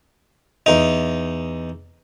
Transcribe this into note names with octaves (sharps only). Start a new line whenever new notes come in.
E2 D#4